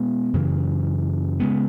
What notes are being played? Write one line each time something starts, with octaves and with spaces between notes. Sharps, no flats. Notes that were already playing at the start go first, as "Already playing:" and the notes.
Already playing: B2 G#3 B3
F#2 C#3 E3
C#3 G#3 B3